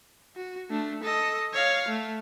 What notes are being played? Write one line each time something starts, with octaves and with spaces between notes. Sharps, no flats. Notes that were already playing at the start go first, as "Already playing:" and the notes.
F#4
A3 D4
A4 D#5
C#5 F5
A3